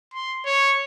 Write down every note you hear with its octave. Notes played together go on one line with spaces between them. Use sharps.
C6
C#5